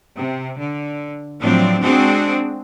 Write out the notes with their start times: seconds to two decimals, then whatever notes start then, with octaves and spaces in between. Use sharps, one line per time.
0.15 C3
0.57 D3
1.41 A2 F3 F#3 C4 D4
1.81 G#3 C4 D4 F#4 G#4